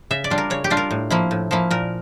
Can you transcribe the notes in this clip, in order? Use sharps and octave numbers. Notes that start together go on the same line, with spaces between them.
C#3 E5
D5
G3 D4 F4
A#4
C#3 C#5
G4
G3 D4 F4
A#4
A2
F3 A#3 E4
A2
F3 A#3 E4
A#2 A#4